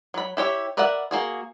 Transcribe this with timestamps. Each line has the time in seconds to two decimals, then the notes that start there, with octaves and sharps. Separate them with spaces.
0.14 F#3 B5
0.37 E4 G4 C#5 E5
0.77 A#4 B4 D5 E5 F#5
1.11 A#3 F#4 G#4